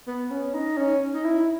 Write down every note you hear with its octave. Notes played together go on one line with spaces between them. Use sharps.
B3
C#4
D#4
C#4
D#4
E4